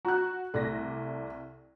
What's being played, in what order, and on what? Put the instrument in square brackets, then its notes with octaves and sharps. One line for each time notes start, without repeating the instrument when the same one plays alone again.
[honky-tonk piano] F#4 [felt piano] A#5 F#6
[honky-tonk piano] C2 A#6 [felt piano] A3 D5